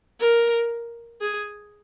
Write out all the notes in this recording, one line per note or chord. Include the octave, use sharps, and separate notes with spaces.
A#4
G#4